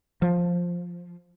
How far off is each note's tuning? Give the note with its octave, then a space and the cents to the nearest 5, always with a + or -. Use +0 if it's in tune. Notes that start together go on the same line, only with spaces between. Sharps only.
F3 +5